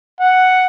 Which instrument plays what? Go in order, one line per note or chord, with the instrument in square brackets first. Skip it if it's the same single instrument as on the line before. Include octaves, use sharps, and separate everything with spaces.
[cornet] F#5